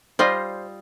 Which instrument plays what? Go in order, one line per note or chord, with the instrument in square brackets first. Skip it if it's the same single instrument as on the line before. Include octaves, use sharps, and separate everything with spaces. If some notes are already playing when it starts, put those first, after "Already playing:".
[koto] G3 F4 D#5 [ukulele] C5